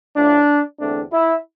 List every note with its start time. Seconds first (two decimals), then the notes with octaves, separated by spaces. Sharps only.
0.16 A2 F3 A3 D4
0.80 E2 D3 A3 C4 D4
1.11 E4